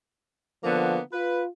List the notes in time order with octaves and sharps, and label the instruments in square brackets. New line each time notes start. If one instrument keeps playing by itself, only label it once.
[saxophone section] D3 A#3 B3 [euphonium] F3
[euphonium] F4 [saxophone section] B4